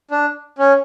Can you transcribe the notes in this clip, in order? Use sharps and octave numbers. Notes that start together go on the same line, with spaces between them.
D4
C#4